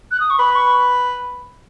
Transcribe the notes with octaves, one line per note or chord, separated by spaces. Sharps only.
F#6
D#6
C#6
B4 B5
C#6